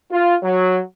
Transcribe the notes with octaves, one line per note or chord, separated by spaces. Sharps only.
F4
F#3